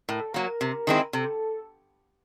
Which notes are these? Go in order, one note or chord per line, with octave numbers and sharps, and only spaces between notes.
A2 A#4
A4
F#3 A#3 A#4
C3
D#3 G#3 C4 E4
C3 A4